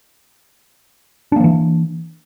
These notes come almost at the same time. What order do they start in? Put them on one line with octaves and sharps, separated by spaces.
D4 A#3 F3 E3